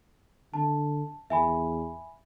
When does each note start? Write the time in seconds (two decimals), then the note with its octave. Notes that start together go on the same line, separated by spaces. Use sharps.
0.54 D3 A5
1.30 E2 E5 G#5 B5